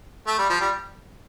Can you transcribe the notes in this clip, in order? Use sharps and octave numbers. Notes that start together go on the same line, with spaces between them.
A3
G3
F3
G3